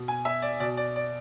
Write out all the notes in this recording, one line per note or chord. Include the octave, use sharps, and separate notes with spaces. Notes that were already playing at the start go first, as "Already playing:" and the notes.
Already playing: B2
G#5
E5
D5
B2 D5
D5
D5